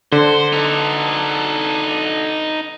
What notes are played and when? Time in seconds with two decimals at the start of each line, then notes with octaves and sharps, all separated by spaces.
0.12 D3 C5
0.53 D#4 A4